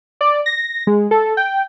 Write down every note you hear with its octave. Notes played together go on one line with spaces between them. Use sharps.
D5
A#6
G#3
A4
G5